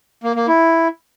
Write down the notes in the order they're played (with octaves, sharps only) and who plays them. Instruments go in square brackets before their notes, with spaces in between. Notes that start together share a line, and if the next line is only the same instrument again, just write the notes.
[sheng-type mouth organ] A#3
A#3
E4